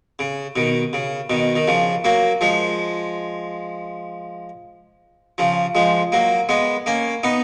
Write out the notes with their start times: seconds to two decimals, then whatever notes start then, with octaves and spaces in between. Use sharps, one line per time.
0.19 C#3
0.56 B2 D#3
0.93 C#3
1.30 B2 D#3
1.56 D#3
1.67 C#3 F3
2.04 F#3 A#3
2.41 F3 G#3
5.38 C#3 F3
5.75 F3 G#3
6.12 F#3 A#3
6.49 G#3 B3
6.86 A#3 C#4
7.23 B3 D#4